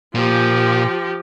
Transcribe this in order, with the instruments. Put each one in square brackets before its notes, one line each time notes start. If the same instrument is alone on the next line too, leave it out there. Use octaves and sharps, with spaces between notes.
[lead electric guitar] A#2 [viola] F3 G4